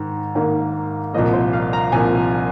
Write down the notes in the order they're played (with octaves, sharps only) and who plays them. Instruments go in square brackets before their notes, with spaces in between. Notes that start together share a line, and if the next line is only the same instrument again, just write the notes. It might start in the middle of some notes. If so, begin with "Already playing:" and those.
Already playing: [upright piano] G#2 D#3
G#2 D#3 A#3
C2 A#2 F3 A#3 D#5
C5
F5
A#5
C2 A#2 F3 A#3 G#5